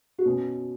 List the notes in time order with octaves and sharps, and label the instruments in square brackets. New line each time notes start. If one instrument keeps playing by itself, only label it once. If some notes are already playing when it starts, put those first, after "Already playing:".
[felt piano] F#4
[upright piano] B2 C#4